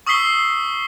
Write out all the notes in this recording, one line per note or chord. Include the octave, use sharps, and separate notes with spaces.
C#6 D#6 E6 B6 C7 G7